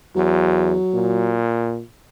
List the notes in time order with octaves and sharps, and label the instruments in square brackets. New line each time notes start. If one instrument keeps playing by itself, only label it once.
[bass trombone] E2 [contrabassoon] F#3
[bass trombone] A#2